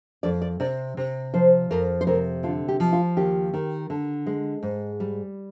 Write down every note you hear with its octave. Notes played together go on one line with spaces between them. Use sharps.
F2 D5
D5
C3 D5
C3
F3 C5
F2 A#4
C5
C3 A#4
D3 F4
G4
F3
F4
D#2 G4
D#3
D3
G#3
G#2
G3